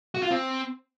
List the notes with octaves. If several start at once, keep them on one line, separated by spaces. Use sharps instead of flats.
F#4
F4
C4